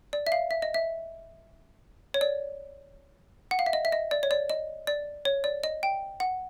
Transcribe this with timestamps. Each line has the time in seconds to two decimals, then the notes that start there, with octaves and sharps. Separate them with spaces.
0.13 D5
0.27 E5
0.32 F5
0.51 E5
0.62 D#5
0.74 E5
2.14 C#5
2.21 D5
3.51 F#5
3.59 F5
3.66 E5
3.73 D#5
3.85 E5
3.92 D#5
4.11 D5
4.23 C#5
4.31 D5
4.50 D#5
4.87 D5
5.25 C#5
5.44 D5
5.64 D#5
5.83 G5
6.20 F#5